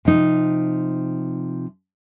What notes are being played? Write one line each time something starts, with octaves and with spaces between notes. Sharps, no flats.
C3 F3 D#4